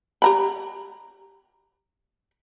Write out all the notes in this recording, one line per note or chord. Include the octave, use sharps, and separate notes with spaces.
G4 A#5 B5